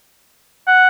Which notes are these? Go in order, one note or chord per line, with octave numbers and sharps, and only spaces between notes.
F#5